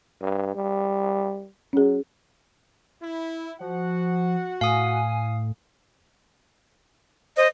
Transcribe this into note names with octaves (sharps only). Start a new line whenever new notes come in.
G2
G3
F#3 C#4 G#4
E4
F3 F#4 F#5
A2 F5 G#5 D#6
C5 D#5